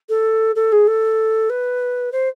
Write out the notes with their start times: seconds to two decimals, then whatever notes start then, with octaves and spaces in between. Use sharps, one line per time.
0.09 A4
0.55 A4
0.72 G#4
0.87 A4
1.49 B4
2.12 C5